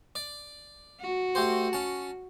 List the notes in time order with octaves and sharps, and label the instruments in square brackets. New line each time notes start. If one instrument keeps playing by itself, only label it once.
[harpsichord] D5
[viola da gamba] F#4
[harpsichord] A3 G4 C5
C#4 A5